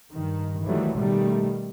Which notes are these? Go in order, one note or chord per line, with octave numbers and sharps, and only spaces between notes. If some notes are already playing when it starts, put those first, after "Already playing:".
G2 D#3
D#3 E3 F#3 G3 A3
B2 D#3 G3 A3